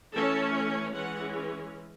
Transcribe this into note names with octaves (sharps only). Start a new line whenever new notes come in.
E3 A3 C#4 A4
E3 G#3 C#4 F#5